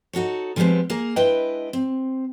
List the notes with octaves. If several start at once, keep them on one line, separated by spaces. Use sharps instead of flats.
D#4 F#4 A4 C#5
D3 F3 G3 G#3 B3 C4
A#3 G#4 A#4
G#3 D4 E4 B4 D#5 G5
C4